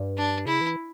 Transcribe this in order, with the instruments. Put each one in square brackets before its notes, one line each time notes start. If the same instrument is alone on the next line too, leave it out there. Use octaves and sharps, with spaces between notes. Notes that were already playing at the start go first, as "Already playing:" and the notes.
Already playing: [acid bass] G2
[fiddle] D4
[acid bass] C#3 [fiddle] E4
[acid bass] E3